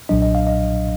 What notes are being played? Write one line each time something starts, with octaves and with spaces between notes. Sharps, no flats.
B1 A#2 F#3 D4 D#5
D#5
F5
D#5